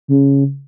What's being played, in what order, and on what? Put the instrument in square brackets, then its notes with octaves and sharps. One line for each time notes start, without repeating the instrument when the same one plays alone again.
[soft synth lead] C#3